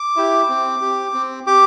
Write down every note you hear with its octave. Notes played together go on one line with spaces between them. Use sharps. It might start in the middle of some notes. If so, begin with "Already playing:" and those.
Already playing: D6
E4 G4
C4
G4
C4
G4 D6